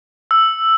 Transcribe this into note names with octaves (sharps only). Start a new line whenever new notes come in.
E6